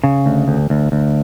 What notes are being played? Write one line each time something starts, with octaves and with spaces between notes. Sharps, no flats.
C#3
D2
D2
D2
D2